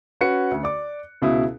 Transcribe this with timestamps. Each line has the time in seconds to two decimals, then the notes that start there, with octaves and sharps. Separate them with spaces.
0.21 C#4 F#4 B4 C#7
0.51 D2
0.63 D5 D6
1.22 C#2 B2 E4 D#6